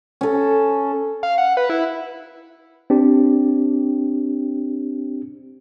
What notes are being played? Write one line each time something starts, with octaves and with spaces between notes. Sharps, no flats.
C#4 A4
F5
F#5
B4
E4
C4 D4 G4